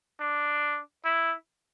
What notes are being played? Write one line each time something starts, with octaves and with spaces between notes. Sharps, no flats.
D4
E4